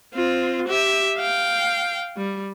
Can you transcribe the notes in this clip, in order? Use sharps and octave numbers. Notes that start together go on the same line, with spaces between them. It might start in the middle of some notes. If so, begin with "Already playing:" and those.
C4 F4
G4 E5
F5 G5
G3